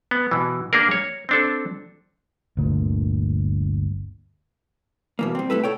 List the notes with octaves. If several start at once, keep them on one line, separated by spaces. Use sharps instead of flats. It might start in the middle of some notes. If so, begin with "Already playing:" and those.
B3
B2 E3
A#3 D4 G#4 A#4
C#5
C4 D4 A4
G1 D2 A#2 D3
B2 E3 A#3
G3 C4
A3 B3 E4 A4 B4
A4 C#5 G5